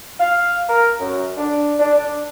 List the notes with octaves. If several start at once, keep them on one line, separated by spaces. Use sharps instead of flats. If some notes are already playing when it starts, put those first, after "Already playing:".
F5
A#4
F#2
D4
D4
D4